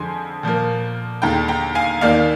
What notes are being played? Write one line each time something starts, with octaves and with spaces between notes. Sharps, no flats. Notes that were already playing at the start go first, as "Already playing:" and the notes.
Already playing: F2 D3 F3 G#3 G#5 C6
A#2 F3 A#3
D#2 D3 G#3 G5 A#5
G5 A#5
F5 G#5
D#2 D#3 A#3 D5 F5